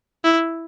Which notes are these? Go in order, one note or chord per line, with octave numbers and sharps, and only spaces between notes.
E4